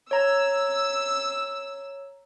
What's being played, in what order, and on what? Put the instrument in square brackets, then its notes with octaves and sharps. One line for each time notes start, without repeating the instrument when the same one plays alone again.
[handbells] C#5 A#5 [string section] E6